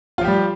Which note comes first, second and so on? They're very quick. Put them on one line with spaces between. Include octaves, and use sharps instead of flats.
F4 F3 G4 G3